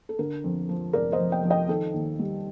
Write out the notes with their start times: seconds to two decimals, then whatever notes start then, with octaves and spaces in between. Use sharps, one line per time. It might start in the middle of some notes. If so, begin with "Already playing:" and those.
0.09 A4
0.19 D3 A#4
0.44 F2
0.69 F3
0.93 F1 A#4 D5
1.12 C5 D#5
1.20 F2
1.32 D#5 G5
1.43 F3
1.50 D#5 G5
1.68 D#3 A4
1.94 D#2
2.19 G3